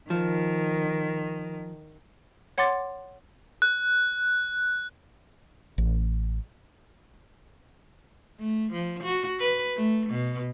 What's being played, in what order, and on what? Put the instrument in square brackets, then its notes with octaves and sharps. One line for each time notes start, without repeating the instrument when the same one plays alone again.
[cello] D#3 [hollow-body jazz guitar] F3
[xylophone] C#5 F#5 C6 D6 A6
[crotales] F#6
[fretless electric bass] A1
[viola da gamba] A3
F3
F#4
B4
A3
B2